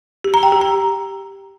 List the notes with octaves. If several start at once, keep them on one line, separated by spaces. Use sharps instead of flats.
G4
A#5
G5
G4
A#5